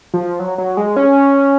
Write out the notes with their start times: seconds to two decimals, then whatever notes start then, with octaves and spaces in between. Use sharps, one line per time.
0.14 F3
0.39 F#3
0.58 F#3
0.77 G#3
0.96 C#4